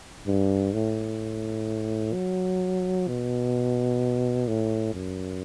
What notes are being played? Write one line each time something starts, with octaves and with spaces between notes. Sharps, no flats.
G2
A2
F#3
B2
A2
F#2